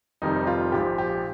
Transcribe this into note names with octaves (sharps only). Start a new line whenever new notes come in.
F1 F2 D#3 G3 D#4
F4
A#1 G#2 F3 G4
G4